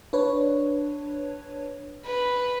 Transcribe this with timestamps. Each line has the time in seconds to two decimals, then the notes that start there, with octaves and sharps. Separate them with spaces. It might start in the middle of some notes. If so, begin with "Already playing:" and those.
0.13 D4 B4 C#5
2.06 B4